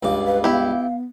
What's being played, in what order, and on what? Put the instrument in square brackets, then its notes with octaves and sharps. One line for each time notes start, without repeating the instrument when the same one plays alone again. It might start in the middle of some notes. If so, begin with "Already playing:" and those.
[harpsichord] C#2 G2 D6 [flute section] F5
[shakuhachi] B4
[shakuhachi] B3 [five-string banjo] E4 G4